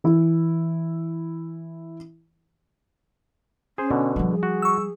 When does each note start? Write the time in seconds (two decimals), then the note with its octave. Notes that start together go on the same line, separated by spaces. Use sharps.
0.04 E3 E4
3.78 C#4 G#4 C5
3.91 B2 D3
4.16 F3 G3
4.29 G#4
4.43 F#4
4.62 C#6 E6